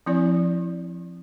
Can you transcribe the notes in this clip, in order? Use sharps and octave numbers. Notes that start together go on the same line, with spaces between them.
F3 C4 E4 D5